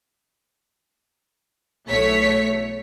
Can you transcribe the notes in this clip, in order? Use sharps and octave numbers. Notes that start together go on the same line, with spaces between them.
B1 E2 A3 C#5 B6 C#7